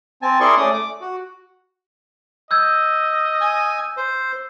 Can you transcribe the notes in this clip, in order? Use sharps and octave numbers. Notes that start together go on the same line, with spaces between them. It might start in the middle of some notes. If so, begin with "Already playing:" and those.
C4 G#5 A5
E4 G#4 A#4 D5 C6 C#6
A3 C#4 D5 D#6
D6
F#4
D#5 E6 G6 G#6
G#5
C5